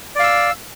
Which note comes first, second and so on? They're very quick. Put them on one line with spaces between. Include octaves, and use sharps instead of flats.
D5 F5 E6